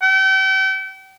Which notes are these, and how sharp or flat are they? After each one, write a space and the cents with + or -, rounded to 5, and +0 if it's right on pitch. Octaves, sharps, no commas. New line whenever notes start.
G5 -40